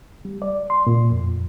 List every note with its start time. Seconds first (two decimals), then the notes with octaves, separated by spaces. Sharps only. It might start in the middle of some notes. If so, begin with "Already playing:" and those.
0.25 G3
0.42 D5
0.70 C6
0.87 A#2
1.11 F2